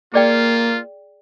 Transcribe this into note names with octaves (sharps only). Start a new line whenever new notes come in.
A#3 F4 G#4 D5 G5